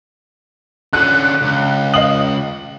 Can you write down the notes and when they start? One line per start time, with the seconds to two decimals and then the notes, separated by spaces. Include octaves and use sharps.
0.93 D3 C#4 F#6
1.42 C#2
1.94 D#5 F5 D#6 F#7